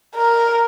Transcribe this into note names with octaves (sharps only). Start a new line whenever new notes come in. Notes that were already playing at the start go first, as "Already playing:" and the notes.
A#4